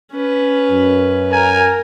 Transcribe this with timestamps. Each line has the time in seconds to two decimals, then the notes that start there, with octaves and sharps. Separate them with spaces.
0.13 C#4 B4
0.71 F#2
1.32 A#4 G#5